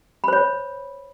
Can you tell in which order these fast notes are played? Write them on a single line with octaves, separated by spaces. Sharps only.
B5 C5 C#5